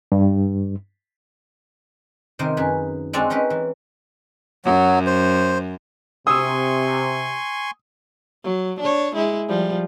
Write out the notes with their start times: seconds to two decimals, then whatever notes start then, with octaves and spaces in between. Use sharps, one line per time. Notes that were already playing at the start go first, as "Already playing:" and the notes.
0.12 G2
2.39 C3 D#3 A#4 C5
2.57 F#2 G#4 B4
3.13 G#3 C4 D4 F#4 A4
3.30 C#4 D#4 A#4 B4
3.50 E3
4.65 F#2 F#3
5.06 C5
6.27 C3 G#5 C6 C#6 D#6 E6
8.44 F#3
8.80 D4 C#5
9.15 G#3 E4
9.48 F3 G3